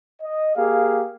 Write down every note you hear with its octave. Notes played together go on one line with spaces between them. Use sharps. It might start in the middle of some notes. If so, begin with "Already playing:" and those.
D#5
A#3 G4 G#4 F5